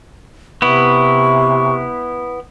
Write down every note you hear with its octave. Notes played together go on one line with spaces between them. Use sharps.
C3 B3 E4 C#6